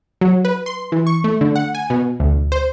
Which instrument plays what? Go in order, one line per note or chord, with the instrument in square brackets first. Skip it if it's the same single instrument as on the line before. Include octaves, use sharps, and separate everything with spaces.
[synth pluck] F#3
B4
C6
E3
C#6
A3
D3
F#5
G#5
B2
D2
C5